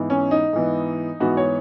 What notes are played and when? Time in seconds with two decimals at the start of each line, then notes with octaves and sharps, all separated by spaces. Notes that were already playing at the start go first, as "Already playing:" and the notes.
Already playing: G#2 E3 B3
0.10 C#4
0.31 D#4
0.53 G#2 E3 B3
1.20 G#2 E3 B3 F#4
1.37 C#5